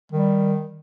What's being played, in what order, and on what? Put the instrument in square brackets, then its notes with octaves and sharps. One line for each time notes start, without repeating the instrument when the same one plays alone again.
[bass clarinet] D#3 [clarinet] G3